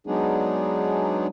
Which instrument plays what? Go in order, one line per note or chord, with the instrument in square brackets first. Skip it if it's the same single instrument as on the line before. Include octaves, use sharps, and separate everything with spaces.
[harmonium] F#3 G#3 B3 D4 D#4 G#4